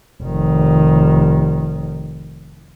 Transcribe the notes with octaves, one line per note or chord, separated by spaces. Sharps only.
F1 D#3